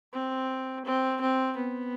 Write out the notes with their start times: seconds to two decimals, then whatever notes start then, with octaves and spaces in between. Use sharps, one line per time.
0.13 C4
0.85 C4
1.21 C4
1.57 B3